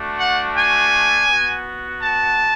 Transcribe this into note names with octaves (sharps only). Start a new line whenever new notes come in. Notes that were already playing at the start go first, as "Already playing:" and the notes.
Already playing: A3 D4 F#4
F#5
G#5
B3 F#4
A5